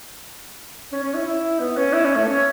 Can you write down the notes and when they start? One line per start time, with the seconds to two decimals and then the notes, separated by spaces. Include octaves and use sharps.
0.92 C#4
1.03 C#4
1.14 E4
1.26 E4
1.60 B3
1.77 C#4
1.93 E4
2.05 C#4
2.16 A3
2.27 C#4